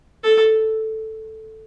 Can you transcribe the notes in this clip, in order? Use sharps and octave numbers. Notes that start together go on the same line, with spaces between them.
A4